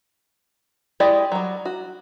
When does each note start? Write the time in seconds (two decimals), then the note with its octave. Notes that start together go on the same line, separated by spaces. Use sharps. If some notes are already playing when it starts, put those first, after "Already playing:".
1.00 G#3 E4 G4 D5 D#5
1.32 F#3 G3
1.65 F#4